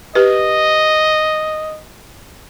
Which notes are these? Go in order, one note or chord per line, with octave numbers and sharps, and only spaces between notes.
G4 B4 D#5